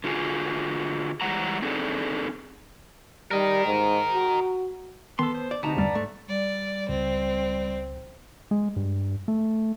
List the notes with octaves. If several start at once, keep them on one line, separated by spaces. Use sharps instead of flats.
D3 F4 F#4 G#4
E3 G3 G#3 F#5 A#5
C4 D4 D#4 G#4 A4
G3 A#4 D#5
G#2
F#4
D#3 B3 A4 A5 C6
C5
D5
D2 C3 B3 D#4 A5 A#5
E2 G2 G3 D5
G#2 A3
G3 D5
C#2 C4
G#3
G2
A3